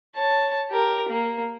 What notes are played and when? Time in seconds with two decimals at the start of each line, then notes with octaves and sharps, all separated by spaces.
0.16 C#5 A5
0.71 G4 A#4
1.09 A#3